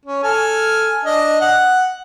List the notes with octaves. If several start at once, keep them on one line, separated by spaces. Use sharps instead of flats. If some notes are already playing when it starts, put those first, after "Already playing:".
C#4
A4 G#5 F6
D4 D#5
F#5